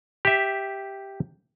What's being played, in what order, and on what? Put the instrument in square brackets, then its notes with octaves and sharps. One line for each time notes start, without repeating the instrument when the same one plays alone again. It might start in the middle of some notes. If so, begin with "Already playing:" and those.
[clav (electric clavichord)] G4 E5